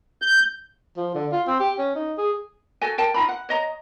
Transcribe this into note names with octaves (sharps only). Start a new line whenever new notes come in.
G6
F3
D3
F4
C4
G4
C#4
D#4
G#4
F#4 A4 G#5
A#4 G5 A5
D#4 F4 A#5 B5
F#5
C#5 D#5 A#5